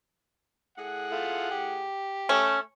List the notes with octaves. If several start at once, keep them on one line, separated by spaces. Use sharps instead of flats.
A2 G#4 F#5
A3 F4
G4
A3 C#4